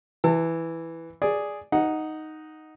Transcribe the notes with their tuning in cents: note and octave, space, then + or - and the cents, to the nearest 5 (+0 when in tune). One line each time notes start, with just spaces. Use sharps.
E3 +0 A5 +35
G#4 +0 D5 +0
D#4 +0 F#5 +0